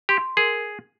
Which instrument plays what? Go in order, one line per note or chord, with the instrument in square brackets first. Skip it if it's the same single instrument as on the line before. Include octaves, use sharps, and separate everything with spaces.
[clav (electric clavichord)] G4 [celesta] C6
[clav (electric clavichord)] G#4 [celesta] A#4